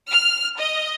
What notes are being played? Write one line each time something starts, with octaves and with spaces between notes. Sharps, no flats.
F6
D#5